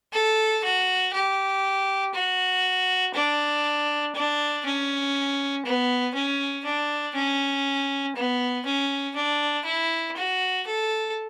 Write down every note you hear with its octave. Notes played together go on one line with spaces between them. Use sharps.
A4
F#4
G4
F#4
D4
D4
C#4
B3
C#4
D4
C#4
B3
C#4
D4
E4
F#4
A4